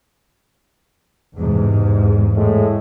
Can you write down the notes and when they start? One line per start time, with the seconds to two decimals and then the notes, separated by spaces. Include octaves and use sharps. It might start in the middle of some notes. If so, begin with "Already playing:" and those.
1.34 E2 G#2 C3
2.36 A2 G#3